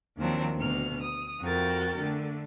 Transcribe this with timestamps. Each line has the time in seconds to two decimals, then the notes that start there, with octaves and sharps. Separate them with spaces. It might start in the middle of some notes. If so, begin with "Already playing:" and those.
0.17 D#2 D#3 F3 F#3 C4 D4
0.56 D2 B2 F6
1.01 D#6
1.41 F2 F#4 A#4 G5 A6
1.98 D3 A3